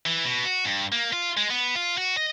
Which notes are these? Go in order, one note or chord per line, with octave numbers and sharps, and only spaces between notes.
E3
B2
F#4
G2
A#3
F4
G#3
B3
F4
F#4
D#5